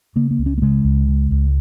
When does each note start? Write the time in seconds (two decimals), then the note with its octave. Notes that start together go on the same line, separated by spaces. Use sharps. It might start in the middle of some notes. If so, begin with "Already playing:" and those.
0.16 C#3 A#3
0.31 A#3
0.38 C#2
0.46 C#4
0.58 A#3
0.62 C#3 G#3
0.84 C#2
1.08 C#3
1.31 C#2